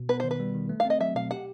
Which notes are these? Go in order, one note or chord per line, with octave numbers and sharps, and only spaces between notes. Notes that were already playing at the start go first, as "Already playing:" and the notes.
Already playing: B2
B3 B4
D#3 C5
B4
G3
D#3
A3
F5
C4 D#5
F#3 E5
B2 F5
G4 F#5